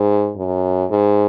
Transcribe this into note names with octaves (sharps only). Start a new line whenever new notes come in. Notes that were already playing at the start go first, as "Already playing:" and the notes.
Already playing: G#2
F#2
G#2